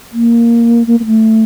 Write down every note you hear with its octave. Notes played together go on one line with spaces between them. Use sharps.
A#3
A#3
A#3
A3